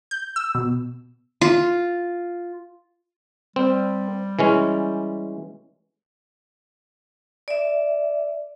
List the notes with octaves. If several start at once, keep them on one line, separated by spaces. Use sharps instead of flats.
G6
E6
B2
F4
G3 C4
E3 G#3 C#4
D5 E5